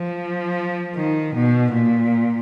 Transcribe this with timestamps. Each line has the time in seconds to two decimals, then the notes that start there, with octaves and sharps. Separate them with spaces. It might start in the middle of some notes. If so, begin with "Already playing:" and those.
Already playing: F3
0.95 D#3
1.35 B2
1.73 A#2